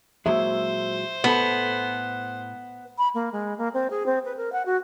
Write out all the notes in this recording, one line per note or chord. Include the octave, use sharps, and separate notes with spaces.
A#2 F#3 G#3 C5 E5
A2 B3 A4
B5
A#3
G#3
A#3
C4
G#4
C4
B4
A#4
F#5
F#4